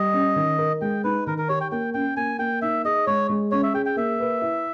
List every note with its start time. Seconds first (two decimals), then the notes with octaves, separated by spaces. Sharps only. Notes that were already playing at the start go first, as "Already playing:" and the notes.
Already playing: G3 D#5
0.14 C#4
0.36 D#3
0.59 A#4
0.81 G#3 G5
1.04 D#4 B4
1.27 D#3 A#4
1.38 A#4
1.49 G4 C#5
1.61 G5
1.72 A#3 G5
1.94 C#4 G5
2.17 A#3 G#5
2.39 A#3 G5
2.62 D#4 E5
2.85 G#4 D#5
3.07 G#3 C#5
3.29 G#3
3.51 C#4 C#5
3.63 E5
3.74 G#4 G5
3.86 G5
3.96 A#3 E5
4.20 B4
4.42 E4